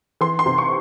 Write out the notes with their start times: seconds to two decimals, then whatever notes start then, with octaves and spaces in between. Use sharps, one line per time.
0.21 E3 C6
0.39 C6
0.46 C3
0.58 C#6